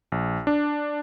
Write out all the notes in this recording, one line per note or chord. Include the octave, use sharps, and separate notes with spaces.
A#1
D4